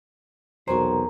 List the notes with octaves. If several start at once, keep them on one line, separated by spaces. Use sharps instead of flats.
B1 E2 C3 F#4 A#4 C5 A#5